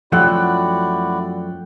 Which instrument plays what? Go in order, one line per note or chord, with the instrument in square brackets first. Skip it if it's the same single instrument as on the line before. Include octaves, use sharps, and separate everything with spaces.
[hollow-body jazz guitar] F#2 F3 A3 [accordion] E4 F#4 D5 [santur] F#5 G5